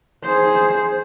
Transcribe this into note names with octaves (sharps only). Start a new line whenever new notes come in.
G#4 C5